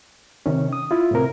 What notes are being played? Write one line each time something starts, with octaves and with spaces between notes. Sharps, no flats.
C3 D#3 C#4
D#6
E4 F4
A2 C3 A#4